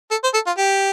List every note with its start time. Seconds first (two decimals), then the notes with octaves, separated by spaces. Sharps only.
0.11 A4
0.23 C5
0.34 A4
0.47 F4
0.57 G4